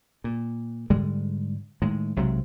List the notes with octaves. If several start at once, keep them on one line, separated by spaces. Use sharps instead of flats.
A#2
G#2 D3 G3 G#3
A2 D#3 G#3
B1 C3 F#3 G#3